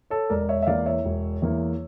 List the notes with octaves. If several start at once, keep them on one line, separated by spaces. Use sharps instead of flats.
A4 C#5
E1 A#4 D5
C#5 E5
E5
E2 E3 A#3 D5 F5
C#5 E5
E1
E2 E3 A#3